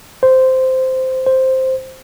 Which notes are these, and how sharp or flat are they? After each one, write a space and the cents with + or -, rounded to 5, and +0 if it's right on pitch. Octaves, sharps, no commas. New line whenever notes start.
C5 -10
C5 +0